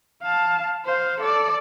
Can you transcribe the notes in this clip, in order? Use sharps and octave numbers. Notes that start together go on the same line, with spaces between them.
F5 A5
C5 F5
A4 D5